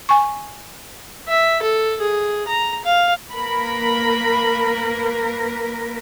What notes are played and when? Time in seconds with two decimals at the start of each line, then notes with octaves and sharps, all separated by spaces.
0.09 G#5 C#6
1.28 E5
1.62 A4
2.00 G#4
2.48 A#5
2.84 F5
3.33 A#3 A#4 B4 B5